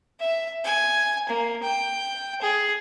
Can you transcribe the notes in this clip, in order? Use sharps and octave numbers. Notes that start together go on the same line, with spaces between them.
E5
G#5
A#3
G5
G#4